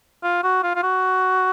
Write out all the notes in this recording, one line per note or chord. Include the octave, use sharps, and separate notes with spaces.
F4
F#4
F4
F4
F#4